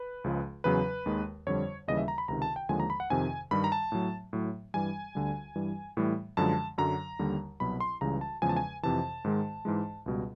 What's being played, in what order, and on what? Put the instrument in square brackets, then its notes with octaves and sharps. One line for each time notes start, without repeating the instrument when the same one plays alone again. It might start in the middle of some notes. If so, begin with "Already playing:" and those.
Already playing: [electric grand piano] B4
C#2 C#3 F3 G#3
E2 C#3 F#3 B4
D#2 D#3 G#3
F2 D3 G3 C#5
D#2 C#3 E3 G3 D#5
E5
A#5
B5
C#2 C3 D#3 A#5
A5
G5
D#2 D3 F3 G#3 G#5
A#5
B5
F#5
F2 C3 D#3 G#5
G2 D#3 G3 B5
A#5
A5
A2 F#3
A2 F#3
G2 E3 G3 G#5
D2 D3 G3
G2 E3 G3
A2 E3 G3
F#2 D3 F3 G#3 A5
F#2 D3 F#3 A#5
D#2 D3 G3
C2 B2 F#3 B5
C6
C#2 C#3 E3 G3 A#5
A5
E2 C#3 F3 G#3 G#5
A5
G#5
F2 C3 E3 A5
G#2 D#3 G#3
G#2 E3 G#3
C#2 B2 G3